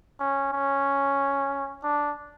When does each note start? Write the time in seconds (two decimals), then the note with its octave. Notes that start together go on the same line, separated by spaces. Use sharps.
0.20 C#4
0.53 C#4
1.84 D4